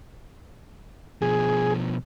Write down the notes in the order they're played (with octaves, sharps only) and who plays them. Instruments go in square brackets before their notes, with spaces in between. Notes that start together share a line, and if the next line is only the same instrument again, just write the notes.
[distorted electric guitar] B2 F3 [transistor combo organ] G#4